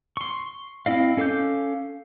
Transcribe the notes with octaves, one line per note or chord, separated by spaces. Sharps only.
C6 C#6
C4 E4 D#5 F5
C#4 A4 F5 D6 G6